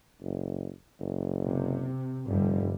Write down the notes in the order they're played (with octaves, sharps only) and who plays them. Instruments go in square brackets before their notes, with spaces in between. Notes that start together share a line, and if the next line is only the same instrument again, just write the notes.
[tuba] F#1
F#1
[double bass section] C3
[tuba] F1 [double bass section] G2 D3 G3